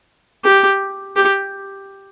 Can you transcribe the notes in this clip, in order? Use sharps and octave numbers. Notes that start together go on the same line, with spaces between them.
G4
G4